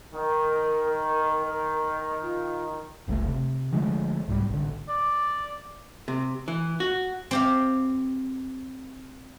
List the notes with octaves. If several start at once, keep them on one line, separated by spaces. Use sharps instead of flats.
D#3 A#4
F4
F#1 C#2 C#3 A3
C3
D3 F3 G#3 A3
C2 G#2 F#3 G3
A1 D3
D5
C3
E3
F#4
C4 G4 F5